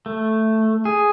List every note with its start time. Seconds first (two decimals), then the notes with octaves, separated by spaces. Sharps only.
0.06 A3
0.85 G#4